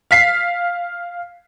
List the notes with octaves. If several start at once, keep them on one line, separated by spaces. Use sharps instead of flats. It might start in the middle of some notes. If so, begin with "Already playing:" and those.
F5 B6 C7